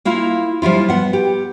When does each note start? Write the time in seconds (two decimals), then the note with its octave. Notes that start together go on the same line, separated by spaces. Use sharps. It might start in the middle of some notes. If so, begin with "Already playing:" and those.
0.05 A#3 E4 F4 F5
0.62 F3 G3 E4 F4
0.89 B3 F#5
1.13 G4